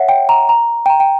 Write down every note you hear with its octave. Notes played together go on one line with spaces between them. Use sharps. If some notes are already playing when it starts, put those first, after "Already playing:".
Already playing: C#5 E5 F#5
G5
A#5
A#5
G5
A#5
G5